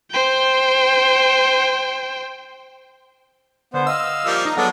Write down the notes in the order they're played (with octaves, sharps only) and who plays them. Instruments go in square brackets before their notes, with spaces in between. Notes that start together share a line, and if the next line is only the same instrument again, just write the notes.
[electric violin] C5 G5
[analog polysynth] D3 [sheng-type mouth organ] B3 C5
[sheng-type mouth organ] D#5 [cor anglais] F5 [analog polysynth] E6
[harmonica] F3 G3 A#3
[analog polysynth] D#4 D#5 A#5
[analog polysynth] F#3 [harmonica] G#3 D4 [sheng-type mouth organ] B3 A4